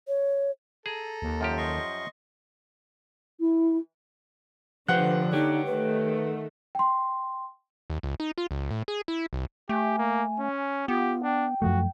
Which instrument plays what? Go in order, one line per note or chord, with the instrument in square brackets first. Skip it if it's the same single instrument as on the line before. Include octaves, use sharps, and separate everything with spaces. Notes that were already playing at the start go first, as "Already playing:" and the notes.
[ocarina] C#5
[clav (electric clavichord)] G#4 [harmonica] A4 [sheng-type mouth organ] A#5
[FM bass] D#2
[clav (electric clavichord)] F#2 F3 G4
[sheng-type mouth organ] D#5 C6 C#6
[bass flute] E4
[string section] D3 [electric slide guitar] F3 G4 C5 [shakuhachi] B4 [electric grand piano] F#5 F#6
[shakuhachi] D#4 [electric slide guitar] G4 C#5
[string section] D#3 A3 [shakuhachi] B4
[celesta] G5 C6
[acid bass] D#2
C#2
D#4
F4
C#2
A2
G#4
E4
C2
[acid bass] A3 [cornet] G4 [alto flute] G#5
[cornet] A#3
C#4
[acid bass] B3 [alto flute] F4 [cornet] G4
[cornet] D4 [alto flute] G5
[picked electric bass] F#2 F3 A3 [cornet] F#4